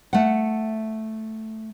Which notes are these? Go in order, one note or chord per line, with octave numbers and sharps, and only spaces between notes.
A3 F#5